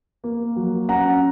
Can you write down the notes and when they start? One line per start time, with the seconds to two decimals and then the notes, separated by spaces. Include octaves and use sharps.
0.24 A#3
0.56 F#3
0.89 C#4 F#5 A#5